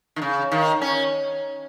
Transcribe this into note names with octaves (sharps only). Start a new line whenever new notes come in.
D#3
C#3
D#3
C#4